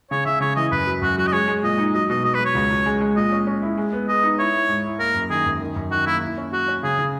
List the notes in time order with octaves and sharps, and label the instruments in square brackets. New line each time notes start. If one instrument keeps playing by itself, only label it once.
[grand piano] C#3 [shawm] C#5
[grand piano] C#3 [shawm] E5
[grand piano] C#3 [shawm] C#5
[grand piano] E3 [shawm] D#5
[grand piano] F#2 [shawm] B4
[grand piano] F#3
[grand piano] F#2 [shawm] F#4
[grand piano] F#3 [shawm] F#4
[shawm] D#5
[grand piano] G#3 [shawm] C#5
[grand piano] G#3
[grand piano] A#2 [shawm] D#5
[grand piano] D#4
[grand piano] F#3 [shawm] D#5
[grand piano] B2 [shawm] D#5
[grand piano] F#3 [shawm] D#5
[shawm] B4
[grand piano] F#3
[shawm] C#5
[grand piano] C#2
C#2
G#3
G#3
[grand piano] A#2 [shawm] D#5
[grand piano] C#4
C#4
E4
G#3
B3
[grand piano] G#3 [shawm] D#5
[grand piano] D#4
[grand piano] E4 [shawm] C#5
[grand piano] E4
G#2
E4
[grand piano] A#3 [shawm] A#4
[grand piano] F#2
[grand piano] D#3 [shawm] G#4
[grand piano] F#2
D#3
F#2
[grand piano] D#3 [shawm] F#4
[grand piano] A#3 [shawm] E4
[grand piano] E4
C#4
[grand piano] F#3 [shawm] F#4
[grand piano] C#4
[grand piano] C#3 [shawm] G#4
[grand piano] C#3